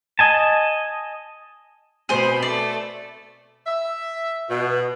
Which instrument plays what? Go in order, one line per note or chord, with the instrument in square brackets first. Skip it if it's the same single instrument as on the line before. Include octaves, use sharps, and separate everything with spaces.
[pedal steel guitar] D#5 G#5 A5
[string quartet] B2 C4 B5 [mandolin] G#4 C5
[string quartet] A3 [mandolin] D5
[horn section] E5
B2